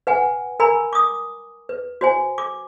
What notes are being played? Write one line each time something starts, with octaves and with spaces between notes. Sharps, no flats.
B4 F#5 G#5
A#4 G#5 A#5 B5
D6 D#6
B4
F#4 C5 G#5
D6